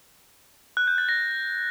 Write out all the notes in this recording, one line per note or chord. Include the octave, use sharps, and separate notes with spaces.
F#6
G6
A6
A#6